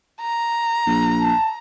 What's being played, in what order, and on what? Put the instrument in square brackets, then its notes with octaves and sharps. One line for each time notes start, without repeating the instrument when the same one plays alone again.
[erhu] A#5
[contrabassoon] A#1
[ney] A5